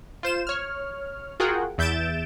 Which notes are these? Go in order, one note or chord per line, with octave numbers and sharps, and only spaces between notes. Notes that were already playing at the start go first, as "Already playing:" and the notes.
F4 C5 E7
C#5 F6
F4 F#4 G#4 A#4 F#5 G5
E2 E5 G6 A6 D7 E7